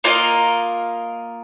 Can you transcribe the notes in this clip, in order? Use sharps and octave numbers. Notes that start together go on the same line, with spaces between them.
A#3 F4 A#4 D#5